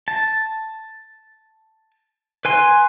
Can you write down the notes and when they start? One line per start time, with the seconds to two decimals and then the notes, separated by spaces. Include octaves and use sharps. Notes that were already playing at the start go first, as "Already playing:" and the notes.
0.08 A5
2.45 B4 G#5 C6